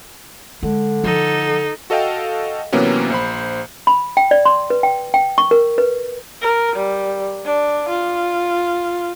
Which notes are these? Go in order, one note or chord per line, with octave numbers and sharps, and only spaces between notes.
D3 G#3
F3 D#4 A4
F#4 A4 D#5 F5 G5
C3 E3 F#3 A#3 B3 C#4
A#1 C5 B5
B5
G5
D5
C6
B4
G5
G5
C#6
A#4
B4
A#4
G3
D4
F4